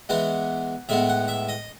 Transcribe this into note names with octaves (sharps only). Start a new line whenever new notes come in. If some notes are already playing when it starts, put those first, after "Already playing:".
E3 G#3 B3 F#5
A2 G#3 B3 E5
F#5
E5
D#5